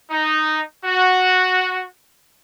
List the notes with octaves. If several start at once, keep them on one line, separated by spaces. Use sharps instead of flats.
D#4
F#4